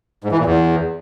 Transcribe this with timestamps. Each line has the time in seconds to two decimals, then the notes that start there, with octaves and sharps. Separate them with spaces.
0.24 G#2
0.31 E3
0.39 A#2
0.46 E2